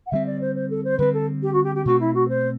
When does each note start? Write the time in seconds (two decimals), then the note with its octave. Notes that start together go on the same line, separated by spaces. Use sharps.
0.06 F#5
0.12 D3 G3 C4 E5
0.26 D5
0.41 C5
0.55 C5
0.70 A4
0.84 C5
0.98 D3 G3 C4 B4
1.13 A4
1.42 G4
1.53 F#4
1.63 G4
1.74 G4
1.85 B2 A3 C4 F#4
1.99 E4
2.14 F#4
2.28 C5